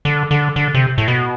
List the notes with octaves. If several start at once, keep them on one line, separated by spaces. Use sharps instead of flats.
D3
D3
D3
C3
A2
B2